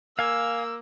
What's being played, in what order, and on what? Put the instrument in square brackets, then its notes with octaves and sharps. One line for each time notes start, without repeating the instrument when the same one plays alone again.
[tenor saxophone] A#3 [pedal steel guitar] F5 G#5 [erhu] E6